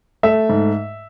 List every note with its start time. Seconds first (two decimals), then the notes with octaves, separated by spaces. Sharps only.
0.23 A3 E5
0.49 G#2